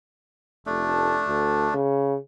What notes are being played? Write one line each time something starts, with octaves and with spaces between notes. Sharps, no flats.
F1 A3 D4
D2
C#3